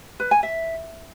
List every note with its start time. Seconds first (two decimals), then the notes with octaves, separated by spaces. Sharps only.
0.20 B4
0.31 G#5
0.43 E5